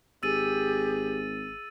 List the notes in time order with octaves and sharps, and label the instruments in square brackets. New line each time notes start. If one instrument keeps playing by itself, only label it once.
[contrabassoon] G#1 [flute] G4 [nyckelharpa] G#4 [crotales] E6 A6 D#7